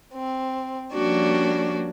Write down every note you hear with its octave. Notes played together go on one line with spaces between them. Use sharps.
C4
F3 G3 A#3 C#4 D4 F#4